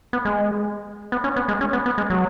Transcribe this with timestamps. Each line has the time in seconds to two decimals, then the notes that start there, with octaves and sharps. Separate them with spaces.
0.13 B3
0.25 G#3
1.12 B3
1.24 C#4
1.36 B3
1.48 G#3
1.61 C#4
1.73 B3
1.86 B3
1.98 G#3
2.10 F#3